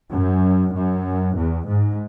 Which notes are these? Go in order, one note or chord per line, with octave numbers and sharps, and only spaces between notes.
F#2
F#2
E2
G#2